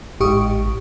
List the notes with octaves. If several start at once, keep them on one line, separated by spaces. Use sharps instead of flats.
A1 G#2 G4 C#6 D#6